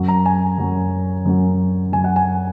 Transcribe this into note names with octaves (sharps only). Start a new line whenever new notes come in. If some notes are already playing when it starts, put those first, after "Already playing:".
Already playing: F#2 F#3
A#5
G#5
F#2 F#3
F#2 F#3
F#2 F#3 G#5
F#5
G#5